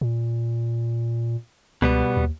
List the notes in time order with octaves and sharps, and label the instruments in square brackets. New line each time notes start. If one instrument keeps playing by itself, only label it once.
[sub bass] A#2
[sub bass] C#2 [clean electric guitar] B2 G3 B3
[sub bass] D#2